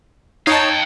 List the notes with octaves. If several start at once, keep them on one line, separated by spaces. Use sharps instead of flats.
D#4 C#5 F5 G5 A5